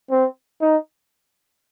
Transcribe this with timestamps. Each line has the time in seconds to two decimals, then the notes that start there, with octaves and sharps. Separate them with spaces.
0.11 C4
0.62 D#4